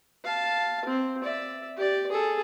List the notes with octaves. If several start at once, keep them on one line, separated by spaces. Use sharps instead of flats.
F5 A5
C4
D5 E5
G4 D5
G#4 A4